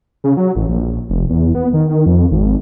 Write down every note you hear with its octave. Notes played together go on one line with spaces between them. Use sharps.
C#3
F#3
A1
A#1
F1
E2
B3
D#3
F2
G#1